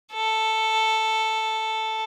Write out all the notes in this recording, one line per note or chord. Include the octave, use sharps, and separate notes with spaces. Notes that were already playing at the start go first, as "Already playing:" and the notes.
A4